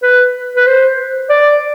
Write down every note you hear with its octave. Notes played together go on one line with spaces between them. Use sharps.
B4
B4
C5
D5